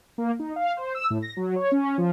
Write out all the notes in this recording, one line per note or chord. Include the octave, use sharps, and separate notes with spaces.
A#3
D#4
F5
C5
E6
A2
A#6
F#3
C#5
C#4
F3